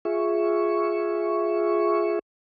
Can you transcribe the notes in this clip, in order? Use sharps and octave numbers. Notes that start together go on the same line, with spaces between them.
F4 G#4 E5 C#6